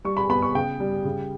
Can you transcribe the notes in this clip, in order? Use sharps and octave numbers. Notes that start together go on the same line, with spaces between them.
G3 C#6
B5
B3 B5
C#6
C#3 G5
G3
C#3